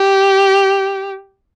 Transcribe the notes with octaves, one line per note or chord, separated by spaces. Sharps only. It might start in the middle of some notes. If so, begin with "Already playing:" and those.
Already playing: G4